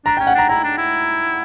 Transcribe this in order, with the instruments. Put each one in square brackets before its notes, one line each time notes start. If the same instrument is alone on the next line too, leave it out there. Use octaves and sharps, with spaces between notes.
[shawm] D4 [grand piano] A#5
[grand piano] G5
[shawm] C#4
[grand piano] F#5
[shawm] D4 [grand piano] A#5
[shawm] E4 [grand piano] A#5
[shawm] D4
E4